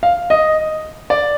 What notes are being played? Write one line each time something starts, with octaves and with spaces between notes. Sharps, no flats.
F5
D#5
D5